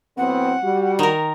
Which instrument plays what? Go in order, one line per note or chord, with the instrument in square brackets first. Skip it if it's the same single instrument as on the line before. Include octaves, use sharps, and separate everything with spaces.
[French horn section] A2 F#3 C4 [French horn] B3 [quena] F#5
[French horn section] G3 [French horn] F#4
[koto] D#3 A#4